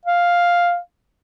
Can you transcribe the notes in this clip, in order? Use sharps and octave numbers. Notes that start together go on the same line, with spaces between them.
F5